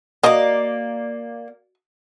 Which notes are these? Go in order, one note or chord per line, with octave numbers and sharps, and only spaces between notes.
A#3 F#4 D5 D#5